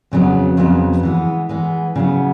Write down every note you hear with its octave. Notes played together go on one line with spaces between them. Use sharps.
F2 C#3 F#3 B3
F2 C#3 F#3 B3
E3 G#3 B3
E3 G#3 B3
C#3 F#3 B3